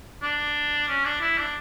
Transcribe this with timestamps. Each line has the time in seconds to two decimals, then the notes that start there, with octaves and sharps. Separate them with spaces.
0.22 D4
0.88 C#4
1.05 D4
1.21 E4
1.38 D4